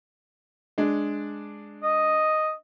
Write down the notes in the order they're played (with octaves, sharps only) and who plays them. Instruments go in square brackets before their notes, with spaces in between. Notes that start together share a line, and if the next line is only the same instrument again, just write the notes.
[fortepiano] G#3 D4
[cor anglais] D#5